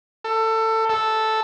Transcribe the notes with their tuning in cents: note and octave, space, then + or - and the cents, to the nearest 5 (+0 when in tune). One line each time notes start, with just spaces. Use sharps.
A4 +20
A4 -5